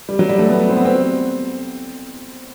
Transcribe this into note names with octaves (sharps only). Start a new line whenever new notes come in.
G3
F#3
G3
A3
B3
C4
B3
C4